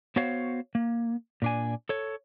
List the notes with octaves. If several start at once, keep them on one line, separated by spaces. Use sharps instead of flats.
B3 F#4 C5 C#5 F5
A#3
A#2 D4 G#5
A4 C#5